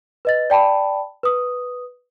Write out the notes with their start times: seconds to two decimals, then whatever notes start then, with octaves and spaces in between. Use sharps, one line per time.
0.25 B4 D#5 A6
0.50 D5 G5 A5 B5
1.23 B4 D#6